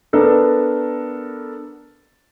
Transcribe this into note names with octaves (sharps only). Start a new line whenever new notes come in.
B3 D4 A4 A#4